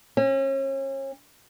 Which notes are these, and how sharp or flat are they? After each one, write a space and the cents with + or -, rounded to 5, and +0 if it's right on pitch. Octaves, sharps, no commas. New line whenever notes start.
C#4 -35